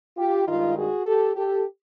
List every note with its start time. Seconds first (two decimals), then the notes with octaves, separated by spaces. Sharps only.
0.17 F4 G4
0.46 G2 D#3 G#3 D#4 F4
0.76 F#4 G#4
1.06 G4 A4
1.35 G4 A4